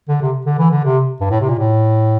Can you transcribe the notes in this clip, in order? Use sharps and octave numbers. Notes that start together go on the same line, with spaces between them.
D3
C3
D3
E3
D3
C3
G2
A2
C3
A#2
A2